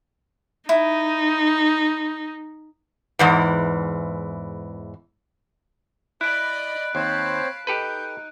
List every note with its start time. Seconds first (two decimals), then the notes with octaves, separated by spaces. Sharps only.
0.69 D#4 E4
3.19 E2 G#2 E3
6.21 E4 D5 D#5 B5 F#6 D7
6.95 D#2 C4 C5 C#5 F5 A5 B5
7.67 D#4 G4 A4 B4 G6